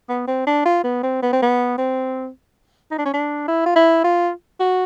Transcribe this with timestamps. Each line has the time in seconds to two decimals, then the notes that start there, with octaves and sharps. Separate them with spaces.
0.09 B3
0.27 C4
0.47 D4
0.65 F4
0.84 B3
1.03 C4
1.22 B3
1.33 C4
1.42 B3
1.78 C4
2.91 D#4
2.99 D4
3.06 C#4
3.13 D4
3.48 E4
3.66 F4
3.76 E4
4.04 F4
4.60 F#4